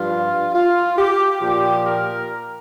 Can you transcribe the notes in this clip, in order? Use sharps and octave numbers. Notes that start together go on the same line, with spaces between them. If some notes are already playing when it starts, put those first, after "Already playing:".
Already playing: G2 F3 F4
F4
G4
A#2 F3 G4
A#4